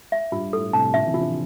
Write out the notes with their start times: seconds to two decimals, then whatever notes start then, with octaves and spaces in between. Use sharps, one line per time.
0.12 E5
0.32 G2 F4
0.53 A2 A4
0.73 A2 C3 A5
0.93 A#2 D3 E5
1.07 C3 E3
1.14 F4
1.21 D3 F3